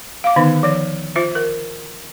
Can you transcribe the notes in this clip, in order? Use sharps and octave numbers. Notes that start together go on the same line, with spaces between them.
F5 D6
D3 D#3 B3 D#4
F3 C#5
F4 C5 E5
A#4